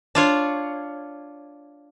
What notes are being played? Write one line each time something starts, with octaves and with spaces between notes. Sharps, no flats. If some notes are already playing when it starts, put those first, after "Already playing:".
D4 F4 C#5